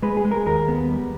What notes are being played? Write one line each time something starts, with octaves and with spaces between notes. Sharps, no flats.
G#3 B4
G#4
G#3
A#4
D#2 A#4
B3
G3